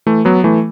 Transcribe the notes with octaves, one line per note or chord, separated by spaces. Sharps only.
E3 A3
F#3 B3
E3 A3